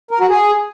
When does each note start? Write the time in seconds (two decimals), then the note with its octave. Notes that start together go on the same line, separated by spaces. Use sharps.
0.11 A#4
0.20 F#4
0.29 G#4